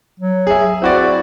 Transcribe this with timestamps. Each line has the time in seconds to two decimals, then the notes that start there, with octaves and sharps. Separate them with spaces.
0.20 F#3
0.47 G#4 E5
0.82 C4 E4 F#4 D5